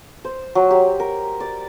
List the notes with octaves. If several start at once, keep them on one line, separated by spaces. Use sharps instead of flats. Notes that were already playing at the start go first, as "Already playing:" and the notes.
C5
F#3
G4
A#4
D5